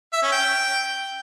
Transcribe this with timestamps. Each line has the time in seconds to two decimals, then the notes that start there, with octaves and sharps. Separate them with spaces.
0.13 E5
0.23 C#4
0.32 G5